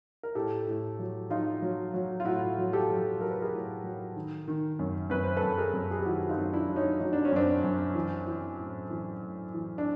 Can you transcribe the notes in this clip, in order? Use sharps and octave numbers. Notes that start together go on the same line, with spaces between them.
A#4
A2 G4 A4
A2
F#3
F#3 D#4 F4
F#3
F#3
F4
A2 E4 F#4
F#3
G4 A4
F#3
F#3 A#4
B4
G#4 A#4
A2
F#3
D#3
D#3
F#2
F#2 B4
C5
A4 B4
F#2
G#4 A#4
F#2
G#4
G4
D#3 E4 F#4
D#4 F4
F#2
D4 E4
F#3
C#4 D#4
F#3 D#4
D4
C#4
F#2 C4 D4
F#2
E3
E3
A2
E3
A2
E3
D4